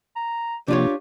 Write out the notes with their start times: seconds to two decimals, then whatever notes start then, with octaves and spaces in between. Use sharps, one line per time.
0.16 A#5
0.68 C3 F3 A#3 D4 F4 G4 C#5